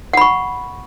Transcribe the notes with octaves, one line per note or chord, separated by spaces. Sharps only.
F#5 B5 C#6